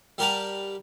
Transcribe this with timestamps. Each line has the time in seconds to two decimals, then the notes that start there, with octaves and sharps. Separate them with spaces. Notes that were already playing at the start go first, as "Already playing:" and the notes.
0.18 G3 G4 A#4 F#5 A5 A#5